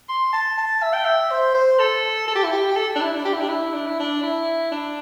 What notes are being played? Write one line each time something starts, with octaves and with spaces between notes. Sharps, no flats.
C6
A5
A5
E5
G5
E5
C5
C5
A4
A4
G4
E4
G4
G4
A4
D4
E4
D4
G4
E4
D4
E4
D4
E4
D4
E4
D4